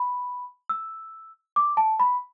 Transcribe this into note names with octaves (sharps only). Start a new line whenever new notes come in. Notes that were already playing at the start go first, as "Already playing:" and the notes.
Already playing: B5
E6
D6
A5
B5